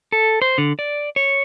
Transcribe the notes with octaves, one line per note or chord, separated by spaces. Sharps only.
A4
C5
D3
D5
C#5